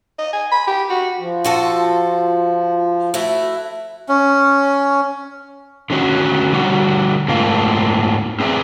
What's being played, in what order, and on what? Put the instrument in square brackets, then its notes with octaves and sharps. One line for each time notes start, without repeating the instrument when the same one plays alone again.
[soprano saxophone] D#5
G#5
B5
G4
F#4
[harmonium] F3
[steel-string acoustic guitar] F4 F#4 A4
A3 E4 F#4
[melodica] C#4
[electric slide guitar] D3 D#3 C#4 F#4
D3 G3 F#4
G#2 A3 A#3 C4 F4 A4
C4 G#4 B4 D5 E5